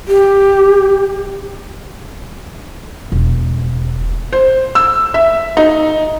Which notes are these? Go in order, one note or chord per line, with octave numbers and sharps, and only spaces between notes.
G4
E1
C5
E6
E5
D#4